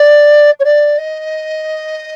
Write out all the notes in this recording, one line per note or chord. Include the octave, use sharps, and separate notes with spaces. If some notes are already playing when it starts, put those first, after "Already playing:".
Already playing: D5
C#5
D5
D#5